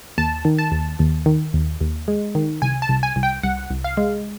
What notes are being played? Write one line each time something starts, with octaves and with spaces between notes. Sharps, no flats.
D#2 A5
D#3
A5
D#2
D#2
D#3
D#2
D#2
G#3
D#3
C2 G#5
A5
C2
G#5
C2
G5
C2 F#5
C2
F5
G#3